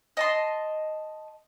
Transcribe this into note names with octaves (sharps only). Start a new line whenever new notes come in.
D#5 A5 C6